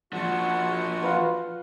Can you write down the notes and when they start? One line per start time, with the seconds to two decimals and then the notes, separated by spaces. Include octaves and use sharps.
0.13 F3 D4 F#4 F#5
1.03 F4 B4